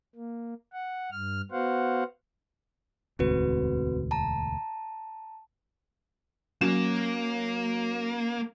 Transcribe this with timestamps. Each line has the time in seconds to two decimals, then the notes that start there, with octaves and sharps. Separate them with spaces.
0.15 A#3
0.73 F#5
1.12 G2 F6
1.51 B3 F#4 C5 F5 F#5
3.19 E1 D2 G#2 C4 F#4 B4
4.11 A5 A#5
6.61 F#3 A#3 C#4 E7